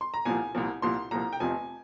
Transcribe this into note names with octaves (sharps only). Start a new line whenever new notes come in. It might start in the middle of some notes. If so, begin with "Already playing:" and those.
C6
A#5
C2 A#2 F3 G#5
C2 A#2 F3
C2 A#2 F3 C6
C2 A#2 F3 A#5
G5
F1 F2 C3 F3 G#5